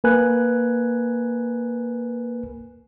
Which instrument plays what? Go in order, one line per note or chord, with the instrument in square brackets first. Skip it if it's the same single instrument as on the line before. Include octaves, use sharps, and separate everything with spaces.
[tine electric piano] A#3 A#4 B4 G#5 F#6